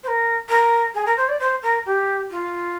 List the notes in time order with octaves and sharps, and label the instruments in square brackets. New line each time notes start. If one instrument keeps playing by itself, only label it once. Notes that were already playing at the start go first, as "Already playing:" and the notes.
[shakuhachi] C5
A#4
A#4
G#4
A#4
C5
D5
C5
A#4
G4
F4